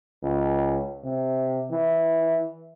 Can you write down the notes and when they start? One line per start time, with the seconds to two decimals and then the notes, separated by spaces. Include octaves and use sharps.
0.23 C#2
1.04 C3
1.71 E3